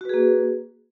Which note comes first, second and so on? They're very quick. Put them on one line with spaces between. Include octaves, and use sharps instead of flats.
F#4 B4 G#4 A#3